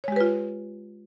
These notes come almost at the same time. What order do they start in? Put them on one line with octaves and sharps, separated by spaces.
C#5 G#3 G4 B4 F4